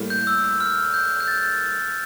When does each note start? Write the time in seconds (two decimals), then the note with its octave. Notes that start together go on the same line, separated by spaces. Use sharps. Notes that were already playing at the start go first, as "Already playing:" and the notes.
Already playing: A2 G3 A#3
0.10 G6
0.27 E6
0.60 F6
0.94 G6
1.20 G6
1.28 A6